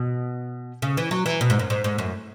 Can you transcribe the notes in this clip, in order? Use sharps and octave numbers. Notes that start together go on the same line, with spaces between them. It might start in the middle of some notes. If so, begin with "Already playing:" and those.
Already playing: B2
C#3
E3
F#3
E3
B2
G#2
F#2
G#2
G#2
F#2